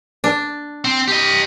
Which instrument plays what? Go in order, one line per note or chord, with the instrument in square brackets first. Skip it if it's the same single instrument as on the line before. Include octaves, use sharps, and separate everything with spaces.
[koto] D4
[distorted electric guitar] C4
G4 D#5